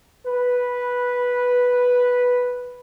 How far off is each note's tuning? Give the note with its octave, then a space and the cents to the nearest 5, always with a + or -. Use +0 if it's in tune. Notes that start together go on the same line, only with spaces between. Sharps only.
B4 -5